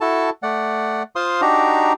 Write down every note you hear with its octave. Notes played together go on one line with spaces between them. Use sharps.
E4 F#4 A4 A5
A3 D5 F#5
F4 C5 F5 C6 D#6
D4 D#4 F#4 G4 A#5